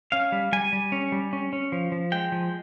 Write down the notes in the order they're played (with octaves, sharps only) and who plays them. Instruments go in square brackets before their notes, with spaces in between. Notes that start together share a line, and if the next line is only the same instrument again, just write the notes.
[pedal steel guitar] C#4 F5
G3
G3 G#5
G3
C#4
G3
C#4
C#4
F3
F3
G#3 G5
F3